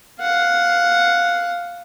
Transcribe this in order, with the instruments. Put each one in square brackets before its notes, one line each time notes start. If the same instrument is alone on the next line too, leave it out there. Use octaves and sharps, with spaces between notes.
[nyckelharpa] F5 F#5